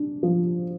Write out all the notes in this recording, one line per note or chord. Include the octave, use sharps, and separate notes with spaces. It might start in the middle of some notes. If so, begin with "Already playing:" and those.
Already playing: D4
F3